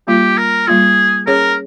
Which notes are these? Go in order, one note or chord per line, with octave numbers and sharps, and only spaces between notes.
G3 A#3 F4 G4
A#4
G3 A#3 F4 G#4
C#4 G#4 A#4 C#5